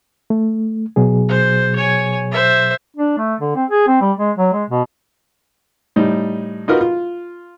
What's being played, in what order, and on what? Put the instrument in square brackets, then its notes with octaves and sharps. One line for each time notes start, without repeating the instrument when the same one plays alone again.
[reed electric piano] A3
B2 F#3 G#4
[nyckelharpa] C5
C#5 G#5
C5 E5
[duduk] D4
A3
D3
C4
G#4
C4
G3
G#3
F#3
G#3
B2
[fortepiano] A2 G3 D#4
D#4 F4 F#4 A#4 B4 D#5
F4